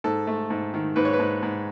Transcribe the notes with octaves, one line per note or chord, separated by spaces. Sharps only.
G#2 A4
A3
G#2
D#3
G#2 B4
C#5
B4
G#2
G#2